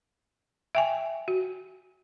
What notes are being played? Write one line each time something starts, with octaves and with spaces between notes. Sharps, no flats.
E5 G5 G#5
F#4